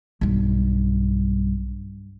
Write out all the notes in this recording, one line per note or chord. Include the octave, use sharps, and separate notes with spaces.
B1 G2